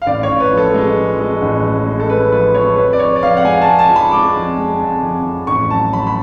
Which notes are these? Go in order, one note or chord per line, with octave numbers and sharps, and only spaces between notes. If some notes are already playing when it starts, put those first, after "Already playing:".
F5
A1 D5
C#5
A1
B4
F3
A4
G#3
F3
G#3
A1
G#3
G#3
A4
G#3 B4
F3 B4
G#3 C#5
F2 B4
D5
F2 C#5
D5
F2 F5
F#5
G#3 G#5
A5
G#3
A5
F3
B5
G#3 D6
F2
G#3
F2
F2
F2
A1 C#6
F#3 A5
F#3 B5
B5